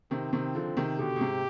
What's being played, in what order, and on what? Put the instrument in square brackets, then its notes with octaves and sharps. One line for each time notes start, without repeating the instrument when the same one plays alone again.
[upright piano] C3 D#3 [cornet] C4
[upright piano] C3 D#3
D3 F3
C3 D#3
[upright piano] B2 D3 [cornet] G4
[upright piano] B2
G#2 C3